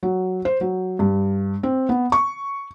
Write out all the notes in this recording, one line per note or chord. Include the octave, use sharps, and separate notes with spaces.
F#3
C5
F#3
G2
C4
B3
C#6